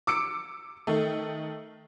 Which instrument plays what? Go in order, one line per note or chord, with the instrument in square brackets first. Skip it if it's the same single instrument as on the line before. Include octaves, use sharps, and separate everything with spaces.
[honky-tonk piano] D6 E6 C#7 D7
D#3 A3